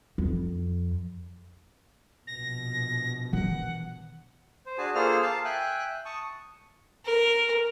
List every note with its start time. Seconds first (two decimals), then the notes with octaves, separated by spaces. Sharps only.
0.18 F2
2.27 A#1 B2 A#6
3.33 D#3 E3 F#5
4.66 C5
4.78 D4 F#4 G#4 G#5 A5
4.95 A#3 F4 G#4 A4 C5 F6
5.22 F5 A5
5.45 E5 G5 G#5 F#6
6.05 A5 C#6 D#6
7.05 A#4